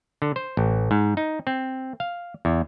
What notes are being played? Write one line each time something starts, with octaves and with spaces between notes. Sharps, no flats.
D3
C5
A1
G#2
D#4
C4
F5
E2